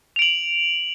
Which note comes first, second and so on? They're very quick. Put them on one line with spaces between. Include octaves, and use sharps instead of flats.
F7 D7 F#7